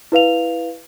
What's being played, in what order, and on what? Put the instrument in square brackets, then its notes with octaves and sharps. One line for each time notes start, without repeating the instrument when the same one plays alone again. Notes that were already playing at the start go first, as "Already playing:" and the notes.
[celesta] E4 B4 F5 F7